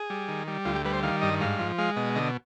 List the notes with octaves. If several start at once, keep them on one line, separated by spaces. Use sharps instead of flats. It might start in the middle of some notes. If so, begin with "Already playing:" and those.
Already playing: G#4
G3
D#3
G3
D2 F4
G4
G3 B4
C5
D#3 F5
G2 D#5
G#2 F5
F3
G#3 F5
B2 D#5
D3 D#5